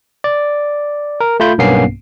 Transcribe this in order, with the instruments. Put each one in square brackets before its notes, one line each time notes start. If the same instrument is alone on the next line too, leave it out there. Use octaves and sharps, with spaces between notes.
[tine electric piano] D5
A#4
A3 F4 B5 G6
B1 G2 A#3 B3 C#4 C7